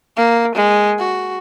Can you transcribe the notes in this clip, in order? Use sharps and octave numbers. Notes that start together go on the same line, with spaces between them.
A#3
G#3
F#4